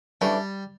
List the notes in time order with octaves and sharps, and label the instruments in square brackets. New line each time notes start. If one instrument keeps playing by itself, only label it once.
[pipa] C#3 E3 A3 D4 [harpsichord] G3